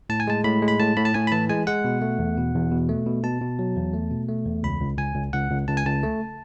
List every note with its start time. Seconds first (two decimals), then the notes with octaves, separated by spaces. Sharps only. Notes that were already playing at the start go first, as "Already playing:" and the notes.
0.09 A2 A5
0.20 G#5
0.27 G#3 A5
0.44 A2 B5
0.62 G#3
0.68 B5
0.79 A2 A5
0.96 A2 B5
1.05 A5
1.14 A2 G#5
1.27 B5
1.32 E3 A5
1.49 G#3 G#5
1.67 G#3 F#5
1.85 B2
2.02 A3
2.19 E2
2.37 B2
2.55 E2
2.71 B2
2.89 A3
3.06 B2
3.23 B2 A5
3.41 B2
3.59 F#3
3.76 E2
3.94 A3
4.11 B2
4.29 A3
4.46 E2
4.63 C#2 B5
4.81 C#2
4.98 C#2 G#5
5.16 C#2
5.33 C#2 F#5
5.51 C#2
5.68 C#2 A5
5.77 G#5
5.86 C#2 A5
6.03 A3